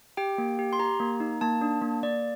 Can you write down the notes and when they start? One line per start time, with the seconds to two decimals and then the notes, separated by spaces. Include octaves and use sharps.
0.17 G4 G5
0.38 A#3
0.59 G4
0.73 C6
0.79 G4 A#5
1.00 A#3
1.20 D#4
1.41 A#3 A5
1.61 D4
1.82 A#3
2.03 A#3 D5